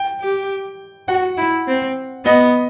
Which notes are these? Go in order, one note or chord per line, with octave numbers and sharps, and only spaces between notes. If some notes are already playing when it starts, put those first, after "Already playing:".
Already playing: G5
G4
F#4 F#5
E4
C4
B3 D#5